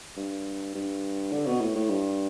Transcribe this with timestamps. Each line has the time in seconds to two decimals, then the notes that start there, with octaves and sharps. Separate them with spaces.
0.17 G2
0.74 G2
1.32 D3
1.46 B2
1.60 A2
1.75 A2
1.90 G2